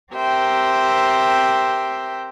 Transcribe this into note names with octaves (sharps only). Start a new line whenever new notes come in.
C4 G4 A#4 C5 E5 G5